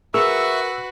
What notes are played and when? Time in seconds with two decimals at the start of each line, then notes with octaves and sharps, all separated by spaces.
0.14 F#4 G#4 A#4 B4 E5 C#6 E6